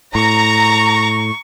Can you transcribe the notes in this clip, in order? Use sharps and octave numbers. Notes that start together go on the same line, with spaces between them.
A2 A#5 C#6